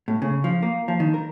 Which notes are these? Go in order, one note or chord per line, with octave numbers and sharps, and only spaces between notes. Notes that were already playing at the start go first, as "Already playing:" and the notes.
A2
C#3
F3
A#3
F3
D#3
A#4